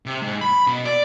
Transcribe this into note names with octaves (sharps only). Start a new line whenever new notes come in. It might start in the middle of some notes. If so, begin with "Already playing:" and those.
C3
G#2
B5
B2
D5